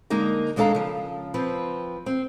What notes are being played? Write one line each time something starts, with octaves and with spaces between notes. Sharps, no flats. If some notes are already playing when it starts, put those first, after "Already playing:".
D3 G#3 A#3 D#4 A#4
D#2 G#3 D4 A4 F5 A#5
C#3 F3
F3 C4 B4
C4